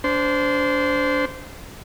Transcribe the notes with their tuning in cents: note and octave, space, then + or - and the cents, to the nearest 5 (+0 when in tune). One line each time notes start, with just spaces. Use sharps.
D4 -30 C5 -15